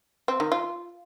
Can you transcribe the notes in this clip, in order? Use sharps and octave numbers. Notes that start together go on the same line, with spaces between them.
C4
D#3
F4